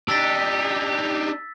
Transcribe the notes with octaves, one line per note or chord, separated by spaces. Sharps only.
D4 D#4 G4 E6 A6 B6